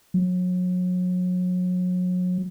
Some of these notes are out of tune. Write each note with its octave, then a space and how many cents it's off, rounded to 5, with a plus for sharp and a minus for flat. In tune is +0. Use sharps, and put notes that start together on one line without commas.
F#3 -35